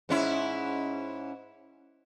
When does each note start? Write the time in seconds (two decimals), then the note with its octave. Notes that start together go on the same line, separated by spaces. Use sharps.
0.09 G#2 C#4 E4